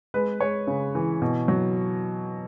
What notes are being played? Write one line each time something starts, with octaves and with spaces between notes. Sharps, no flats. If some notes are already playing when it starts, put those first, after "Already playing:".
G#3 B4
G#3 C#5
C#3
E3
B2
F#3